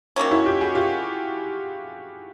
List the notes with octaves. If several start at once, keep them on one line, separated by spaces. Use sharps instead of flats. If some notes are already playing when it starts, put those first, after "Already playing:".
D#3 F#3 A#3 C#4
E4 F#4
F4 G4
F#4 G#4
F4 G4